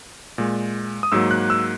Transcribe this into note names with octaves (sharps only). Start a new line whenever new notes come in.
A#2 G#3
D#6
G#2 F#3 A#3 E6
F#6
E6